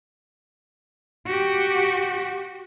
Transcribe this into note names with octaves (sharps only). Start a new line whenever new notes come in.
F#4 G4